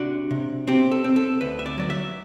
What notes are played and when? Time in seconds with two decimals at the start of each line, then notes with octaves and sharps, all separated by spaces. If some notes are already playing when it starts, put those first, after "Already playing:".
Already playing: C3 D4 F#4
0.31 C3
0.67 C4 G4
0.92 A4
1.04 C4
1.16 A4
1.41 D2 B4
1.59 E5
1.66 D5
1.78 F#3 D5
1.90 E5